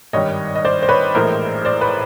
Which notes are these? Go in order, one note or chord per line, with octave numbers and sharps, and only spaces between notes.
G#1 G2 D#3 G3 C#5 D#5
D#5
C5 D5
C5
B4 C#5
A#1 A2 E3 G#3 A#4 C5
C5 D5
B4 C#5